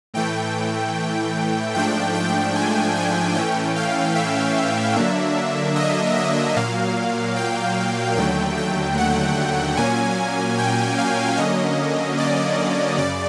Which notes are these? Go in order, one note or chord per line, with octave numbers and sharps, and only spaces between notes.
A2 E3 A3 G5
G#2 F3 A3 D4 G5
G5
G#5
G#5
A2 E3 A3 C#4 G5
F5
E5
D3 F#3 A#3 D4
D#5
E5
A#2 F#3 A#3 F5
G5
D#2 D3 F#3 A3 G5
G5
F#5
A#2 F#3 A#3 C#4 G#5
G5
F5
D3 F#3 A#3 C#4 D#5
D5
F#2 C#3 D5